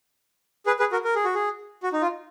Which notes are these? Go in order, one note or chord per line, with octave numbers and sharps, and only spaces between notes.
G#4 B4
G#4 B4
F#4 A#4
A#4
G#4
F#4
G#4
F#4
D#4
F4